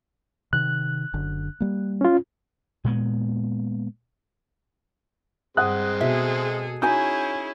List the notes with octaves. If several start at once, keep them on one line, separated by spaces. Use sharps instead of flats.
C3 D#3 F#6
F#1 D3
G3 A#3
C#4 F4
A#2 G#3 B3
G2 G#3 C4 F#5 D#6 F#6
B2 G#4 A4 E5
C#4 D#4 E4 F#4 G#4 G#5 G6